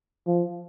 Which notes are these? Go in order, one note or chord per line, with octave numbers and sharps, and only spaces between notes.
F3